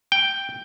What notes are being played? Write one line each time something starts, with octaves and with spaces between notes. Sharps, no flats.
G5